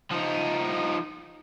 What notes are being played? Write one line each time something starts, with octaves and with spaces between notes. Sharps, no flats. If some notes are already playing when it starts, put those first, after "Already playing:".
F3 D#4